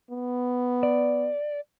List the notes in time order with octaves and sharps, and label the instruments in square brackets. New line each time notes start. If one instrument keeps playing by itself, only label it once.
[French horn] B3
[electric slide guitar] D5